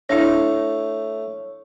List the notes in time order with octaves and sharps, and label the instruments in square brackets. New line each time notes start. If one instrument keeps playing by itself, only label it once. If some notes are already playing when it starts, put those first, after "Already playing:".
[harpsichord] A3 F5 [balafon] D4 E4 [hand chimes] C#5